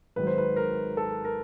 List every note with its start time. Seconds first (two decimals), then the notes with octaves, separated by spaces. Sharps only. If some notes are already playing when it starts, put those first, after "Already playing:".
0.16 G#1 G#2 D#3 F#3 B4
0.27 C5
0.38 B4
0.56 A#4
0.97 A4
1.25 A#4